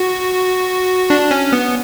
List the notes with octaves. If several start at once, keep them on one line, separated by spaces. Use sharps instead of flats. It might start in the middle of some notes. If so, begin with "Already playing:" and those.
Already playing: F#4
D4
C#4
B3